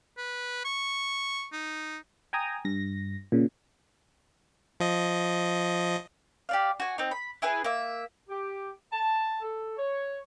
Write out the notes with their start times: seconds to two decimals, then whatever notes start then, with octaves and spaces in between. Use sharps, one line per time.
0.18 B4
0.65 C#6
1.53 D#4
2.33 G5 G#5 A#5 D#6
2.65 G2 A#6
3.32 A#2 C#3
4.80 F3 D#5
6.49 G4 D5 F5
6.80 F#4 G#5
6.98 C4 D#4
7.11 B5
7.42 E4 G#4 B4 G#5
7.64 A#3 E5
8.29 G4
8.92 A5
9.41 A4
9.77 C#5